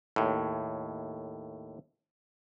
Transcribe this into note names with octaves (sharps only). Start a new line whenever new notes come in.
D#2 A2